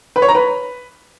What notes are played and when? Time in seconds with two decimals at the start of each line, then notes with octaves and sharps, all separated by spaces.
0.16 B4
0.22 C#5
0.28 A#5
0.35 B4